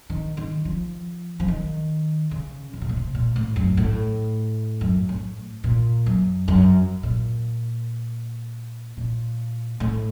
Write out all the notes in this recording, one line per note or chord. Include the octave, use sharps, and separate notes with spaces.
D#3
D#3
F3
F3
D#3
C#3
C#3
C3
A#2
C3
A#2
A2
F#2
A2
F#2
A2
A#2
F#2
F#2
A#2
A#2
A2